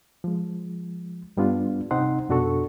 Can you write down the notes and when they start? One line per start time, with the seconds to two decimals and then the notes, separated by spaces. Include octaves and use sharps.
0.24 F3 G#3
1.37 G2 G3 B3 D4 F4
1.91 C3 C4 D#4 F#5 C6
2.29 F2 B2 D4 F#4 A4 C#6